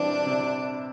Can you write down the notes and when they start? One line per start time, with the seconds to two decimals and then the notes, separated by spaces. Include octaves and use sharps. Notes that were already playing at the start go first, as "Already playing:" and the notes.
Already playing: E3 G3 C4 D4
0.26 C3